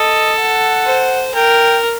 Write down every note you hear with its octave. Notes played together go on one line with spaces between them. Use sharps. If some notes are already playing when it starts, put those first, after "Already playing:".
Already playing: A4 D#5
F#5
C5
A#4 G5